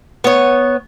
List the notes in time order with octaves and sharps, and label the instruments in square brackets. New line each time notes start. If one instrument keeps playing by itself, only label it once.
[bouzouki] B3 C#5